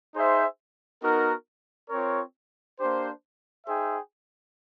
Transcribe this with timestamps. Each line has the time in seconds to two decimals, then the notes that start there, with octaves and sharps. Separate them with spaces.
0.14 D#4 G#4 C5 E5
1.02 B3 D#4 F#4 A#4
1.90 C4 F4 A#4 C#5
2.79 A#3 D4 G4 C5
3.66 D#4 G#4 C5 E5 G5